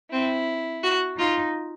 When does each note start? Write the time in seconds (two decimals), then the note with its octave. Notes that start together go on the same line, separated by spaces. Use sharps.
0.12 C4 E4
0.83 F#4
1.18 D#4 F4